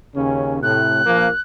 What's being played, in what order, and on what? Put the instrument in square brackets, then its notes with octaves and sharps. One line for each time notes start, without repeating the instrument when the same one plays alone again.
[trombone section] D#2 C#3 C#4
[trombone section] A2 C3 [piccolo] F#6
[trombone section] A#1 F3 A#3